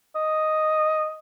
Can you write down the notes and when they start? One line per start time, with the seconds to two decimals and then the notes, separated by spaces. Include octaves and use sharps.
0.16 D#5